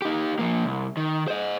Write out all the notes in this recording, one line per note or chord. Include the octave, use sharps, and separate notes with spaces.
D#4 G4
F3 A#3
C2
D#3
C5 D#5